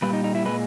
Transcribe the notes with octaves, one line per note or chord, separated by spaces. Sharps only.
A#2 G3 B4
D#4
D#4
E4
A#2 G#3 B4